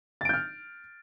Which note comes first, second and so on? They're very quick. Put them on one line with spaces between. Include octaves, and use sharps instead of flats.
A6 D7 G6 F6